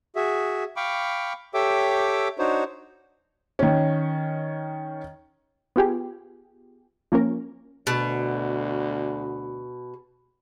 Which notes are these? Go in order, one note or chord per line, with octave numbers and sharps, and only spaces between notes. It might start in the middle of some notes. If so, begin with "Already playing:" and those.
F#4 G#4 E5
F5 G5 B5 C#6 D6
G4 A4 C#5 E5 G5 D6
D4 D#4 F#4 C5 C#5
D#3 C#4
B3 F4 G4 G#4
F3 A#3 C#4 A#4
D2 B2